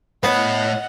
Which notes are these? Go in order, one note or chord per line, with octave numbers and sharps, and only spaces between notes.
A2 B3 C#5 D#5 F#5